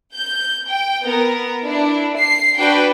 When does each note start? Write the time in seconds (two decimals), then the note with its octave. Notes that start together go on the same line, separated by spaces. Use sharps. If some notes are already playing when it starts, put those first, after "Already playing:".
0.13 G6
0.66 G5
1.03 B3 A#4
1.64 D4 E4
2.16 C7
2.58 D4 F#4 B4 G5